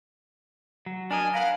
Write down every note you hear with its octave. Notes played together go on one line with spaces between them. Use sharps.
F#3
D4 A#4 D#5 G#5
A#4 B4 F5 F#5